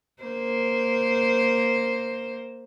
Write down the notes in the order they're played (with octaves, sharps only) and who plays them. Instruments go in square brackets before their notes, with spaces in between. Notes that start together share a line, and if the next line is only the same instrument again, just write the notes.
[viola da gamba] A#3 C5